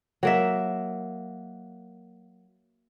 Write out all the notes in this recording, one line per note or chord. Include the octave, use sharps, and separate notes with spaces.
F#3 A#3 E5